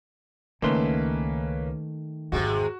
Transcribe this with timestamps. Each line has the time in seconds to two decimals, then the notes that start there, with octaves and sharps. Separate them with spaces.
0.62 C#2 D#3 A3 A#3 C#4 B4 C6
2.32 G#1 E2 C3 G#3 F#4